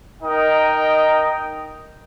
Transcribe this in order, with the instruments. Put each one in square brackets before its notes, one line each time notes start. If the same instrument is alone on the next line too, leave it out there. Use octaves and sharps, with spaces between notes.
[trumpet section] D#4 A#4 D#5 G5